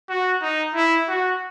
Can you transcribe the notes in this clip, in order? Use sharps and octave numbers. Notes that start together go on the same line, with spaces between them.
F#4
D#4
E4
F#4